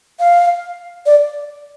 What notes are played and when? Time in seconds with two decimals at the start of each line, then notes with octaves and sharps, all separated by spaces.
0.20 F5
1.06 D5